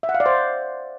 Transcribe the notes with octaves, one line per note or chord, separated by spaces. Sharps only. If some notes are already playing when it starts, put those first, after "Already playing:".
E5
F#5
F5
D5
C5